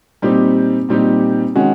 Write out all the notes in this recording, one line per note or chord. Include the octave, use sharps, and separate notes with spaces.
A#2 G3 C4 D#4 G4
A#2 G3 C4 D#4 G4
D#3 G#3 C#4 F#4